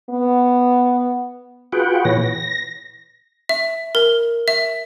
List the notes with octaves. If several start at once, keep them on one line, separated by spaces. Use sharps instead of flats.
B3
F4 F#4 G#4 B4 F#5 G5
A#2 E3 B4 C#5 A#6
A#6
E5
A#4
E5